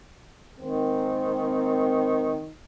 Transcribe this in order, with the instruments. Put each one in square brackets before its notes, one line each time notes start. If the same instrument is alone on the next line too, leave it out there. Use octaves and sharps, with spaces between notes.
[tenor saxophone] D#3 [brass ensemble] G#3 A#3 C4